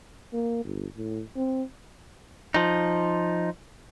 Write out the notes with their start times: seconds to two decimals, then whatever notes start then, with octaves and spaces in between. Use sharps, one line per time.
0.33 A#3
0.65 G1
0.97 A2
1.36 C4
2.54 F3 D#4